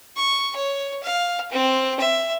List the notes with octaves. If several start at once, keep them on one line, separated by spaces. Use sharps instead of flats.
C#6
C#5
F5
C4
E5